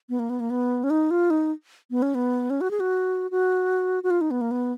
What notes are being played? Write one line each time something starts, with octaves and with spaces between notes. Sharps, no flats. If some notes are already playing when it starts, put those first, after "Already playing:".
B3
A#3
B3
A#3
B3
C#4
D#4
F4
D#4
B3
C#4
B3
C#4
F#4
G#4
F#4
F#4
F#4
F4
D#4
B3
A#3
B3